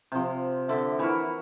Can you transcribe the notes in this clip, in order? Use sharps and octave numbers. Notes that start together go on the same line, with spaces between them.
C3 F3
D3 E5
E3 E4 F#4 A#4